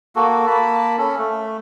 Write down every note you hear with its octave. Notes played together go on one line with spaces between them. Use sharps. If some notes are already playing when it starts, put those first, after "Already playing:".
A#3 F#4 A4
A#3 A5 B5
C#4 A4
A3